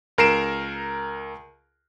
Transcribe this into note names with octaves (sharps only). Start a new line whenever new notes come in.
C#2 A#4 A#5 C7 D7 E7